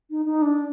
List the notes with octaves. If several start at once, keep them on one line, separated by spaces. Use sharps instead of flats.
D#4
D#4
D4